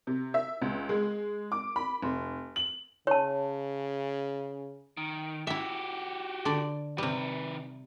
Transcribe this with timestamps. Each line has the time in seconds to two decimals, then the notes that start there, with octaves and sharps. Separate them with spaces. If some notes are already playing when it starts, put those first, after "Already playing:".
0.07 C3
0.34 E5
0.62 C#2
0.89 G#3
1.52 D6
1.76 B5
2.02 F1
2.56 F#7
3.07 C#3 C#5 A5
4.97 D#3
5.47 E4 F#4 G4 E5
6.45 D3 D5
6.98 C3 D#3 G3 B4